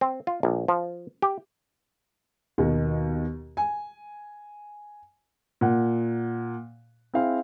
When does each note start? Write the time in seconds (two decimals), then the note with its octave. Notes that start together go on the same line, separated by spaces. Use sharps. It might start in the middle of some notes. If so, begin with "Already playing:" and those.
0.01 C4
0.27 F4
0.43 A#1
0.68 F3
1.22 G4
2.58 D#2 B2 D#3
3.57 G#5
5.61 A#2 F#5
7.14 C4 E4 G#4 F5